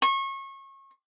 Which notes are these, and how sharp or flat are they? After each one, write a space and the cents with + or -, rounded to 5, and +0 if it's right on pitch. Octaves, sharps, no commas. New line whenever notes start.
C#6 -30